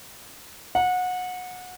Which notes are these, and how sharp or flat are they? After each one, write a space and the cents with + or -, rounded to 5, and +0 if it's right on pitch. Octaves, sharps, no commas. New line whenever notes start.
F#5 -25